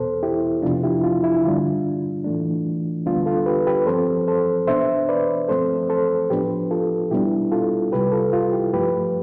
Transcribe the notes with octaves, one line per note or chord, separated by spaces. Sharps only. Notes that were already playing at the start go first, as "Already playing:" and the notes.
Already playing: E2 B2 B3 A4 C5
E4 G4
F2 C3 F3 B3 D4 F4
E4 G4
F4
E4
G2 D3 G3 D4 F4
A2 E3 A3 D4
D2 D3 G3 B3 D4 F4
F4 A4
G4 B4
G4 B4
G2 F3 C4 A4 C5
A4 C5
B2 B3 D4 C5 E5
B4 D5
G2 F3 A3 C4 A4 C5
A4 C5
A2 F3 B3 D4 G4 B4
F4 A4
B2 G3 B3 D4 E4 G4
F4 A4
C2 C3 G3 G4 B4
F4 A4
F4
E4 G4
G2 F3 A3 G4 B4